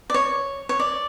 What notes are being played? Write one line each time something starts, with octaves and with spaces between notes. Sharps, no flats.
D5
C#5
C#5
D5